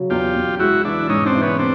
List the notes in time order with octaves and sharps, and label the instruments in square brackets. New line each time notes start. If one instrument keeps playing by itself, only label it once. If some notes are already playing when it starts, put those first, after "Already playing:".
Already playing: [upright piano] C#3 F#3
[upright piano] E2 [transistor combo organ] F4 G4
[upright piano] E2
[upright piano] G#3 [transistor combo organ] E4 F#4
[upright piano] E3 [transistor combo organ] D4 E4
[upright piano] G#2 [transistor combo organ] C#4 D#4
[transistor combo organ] C4 D4
[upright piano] E3
[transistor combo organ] B3 C#4
C4 D4